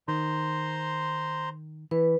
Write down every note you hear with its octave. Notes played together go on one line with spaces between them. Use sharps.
D#3 C5 A#5 C6
E3 B4